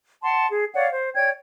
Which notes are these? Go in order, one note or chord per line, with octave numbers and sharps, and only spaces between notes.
F#5 A5 C6
G#4
C#5 D5 F5 F#5
C5
C#5 D5 G5 G#6